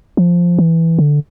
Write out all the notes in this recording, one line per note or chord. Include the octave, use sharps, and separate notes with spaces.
F3
E3
D3